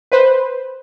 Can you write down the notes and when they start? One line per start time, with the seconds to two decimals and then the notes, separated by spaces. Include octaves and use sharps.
0.12 B4 C5